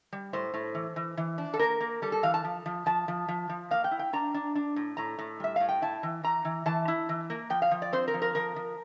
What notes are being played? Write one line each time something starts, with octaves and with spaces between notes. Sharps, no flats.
G3
A2 C5
A2
E3
E3
E3
D4
A4
A#3 A#4
A#3
G3 A4
A4
E3 F5
A5
F3
F3
F3 A5
F3
F3
F3
A#3 F5
G5
E4
G5
D4 A#5
D4
D4
A2
A2 A#5
A2
G3 E5
A2 F5
G5
E4 A5
E3
E3 A#5
E3
E3 A5
E4
E3
A#3
F3 G5
F5
F3
D5
C4 C5
A#4
F3
A#4
F3 A#4
F3